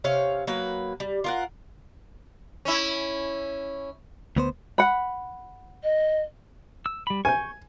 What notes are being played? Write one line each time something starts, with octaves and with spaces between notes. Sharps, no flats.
C3 C#4 C#5 F5
F#3 A#3 B4
G3
F4 A#4 F#5
C#4 E4
D2 B3 C5
F#5 B5
D#5
E6
G3 B5
G#5 C#6 G6